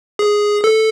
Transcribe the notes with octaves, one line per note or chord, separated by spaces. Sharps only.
G#4
A4